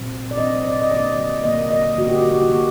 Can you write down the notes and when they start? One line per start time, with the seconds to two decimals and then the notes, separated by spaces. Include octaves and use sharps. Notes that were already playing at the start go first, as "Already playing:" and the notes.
Already playing: A#2 F#3 C4
0.31 D5
0.38 A#2 F#3 C4 D#5
0.65 D5
0.82 D#5
0.91 D3 F#3 A#3 D5
1.44 D3 F#3 A#3 D#5
1.71 D#5
1.98 D3 F#3 A#3 F#4
2.08 G4
2.19 F#4
2.30 G4
2.39 F#4
2.50 D3 F#3 A#3 G4